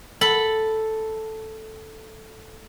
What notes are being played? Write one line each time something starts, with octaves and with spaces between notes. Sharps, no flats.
A4 B5